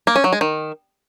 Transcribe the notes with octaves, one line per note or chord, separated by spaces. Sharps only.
A#3
C#4
F#3
G#3
D#3